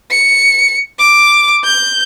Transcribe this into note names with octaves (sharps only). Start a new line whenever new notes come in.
C#7
D6
G6